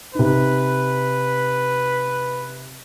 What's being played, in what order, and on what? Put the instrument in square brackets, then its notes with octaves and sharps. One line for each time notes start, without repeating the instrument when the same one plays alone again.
[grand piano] C3 D#4 [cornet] B4